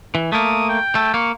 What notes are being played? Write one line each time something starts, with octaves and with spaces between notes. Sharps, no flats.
E3
A3 A#3 D#6
G5
A3
A#3 C#6